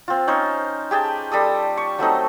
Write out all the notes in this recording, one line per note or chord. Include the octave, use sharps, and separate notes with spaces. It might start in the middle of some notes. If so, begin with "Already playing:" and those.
C4 F4
C#4 D#4 C5
G4 G#4 G5 A5
G3 A4 D#6
C#6
F#3 A3 C4 D#4